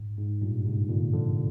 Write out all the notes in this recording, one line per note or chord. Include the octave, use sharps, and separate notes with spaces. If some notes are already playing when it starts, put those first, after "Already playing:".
Already playing: G#2
G#2
G2 A#2
G#2 C3
A#2 D3
D3 F3